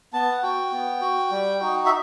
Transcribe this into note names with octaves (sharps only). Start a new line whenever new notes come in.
B3 A5
F#5
F#4 G5
B3
F#4
G3
D#4 F#4
E5